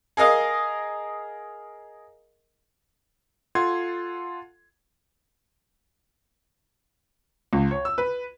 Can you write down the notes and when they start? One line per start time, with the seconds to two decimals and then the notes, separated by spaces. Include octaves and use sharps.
0.17 G#4 A#4 D#5 F5
3.55 F4 A4 F#5 C6 G#6
7.53 C#2
7.71 C#5
7.85 E6
7.98 B4